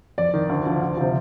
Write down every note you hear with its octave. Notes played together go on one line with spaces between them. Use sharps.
F2 D5
D#3
D2
D3 F3
D2
C3 F3